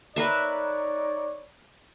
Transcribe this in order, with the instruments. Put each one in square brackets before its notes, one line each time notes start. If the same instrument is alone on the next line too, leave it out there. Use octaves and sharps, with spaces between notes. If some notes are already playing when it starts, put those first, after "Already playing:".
[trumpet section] D#4 C#5 D5 [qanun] A#4 B4 E5